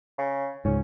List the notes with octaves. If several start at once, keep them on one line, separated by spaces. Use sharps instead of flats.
C#3
C#2 G#2 C#4